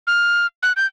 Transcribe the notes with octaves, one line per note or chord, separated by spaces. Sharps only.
F6
F#6
G6